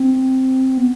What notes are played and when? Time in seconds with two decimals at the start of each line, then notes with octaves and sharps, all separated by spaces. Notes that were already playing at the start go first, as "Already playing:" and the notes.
Already playing: C4
0.78 B3